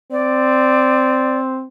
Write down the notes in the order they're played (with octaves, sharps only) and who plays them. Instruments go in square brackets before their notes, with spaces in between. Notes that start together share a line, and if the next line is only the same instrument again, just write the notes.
[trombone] C4 [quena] D5